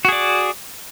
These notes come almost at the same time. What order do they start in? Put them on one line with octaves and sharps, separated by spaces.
F#4 G#4 D5